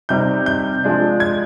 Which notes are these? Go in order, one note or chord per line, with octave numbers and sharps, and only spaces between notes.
C3 G3 C4 D#4 G6
G6
F3 G#3 D4
G#6